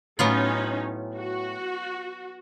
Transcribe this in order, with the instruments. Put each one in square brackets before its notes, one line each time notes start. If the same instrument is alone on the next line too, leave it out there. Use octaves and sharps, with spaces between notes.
[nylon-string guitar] A2 [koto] F#3 B3 F4 [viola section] C#4 D#4
[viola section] F#4